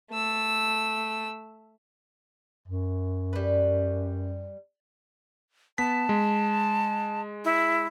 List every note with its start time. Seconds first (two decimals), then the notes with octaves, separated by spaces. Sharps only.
0.11 A3 E6
2.68 F#2
3.33 G3 B4
5.78 B3 A5 B6
6.09 G#3
7.45 E4